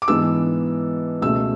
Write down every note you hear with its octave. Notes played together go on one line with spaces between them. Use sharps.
D6
G#2 E3 B3 D4 E6
C#2 B2 A3 E6